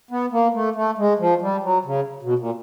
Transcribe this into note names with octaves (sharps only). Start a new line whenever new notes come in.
B3
A#3
A3
A3
G#3
F3
G3
F#3
C#3
B2
A#2